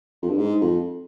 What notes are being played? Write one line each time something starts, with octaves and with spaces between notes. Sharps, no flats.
F2
G2
G#2
F2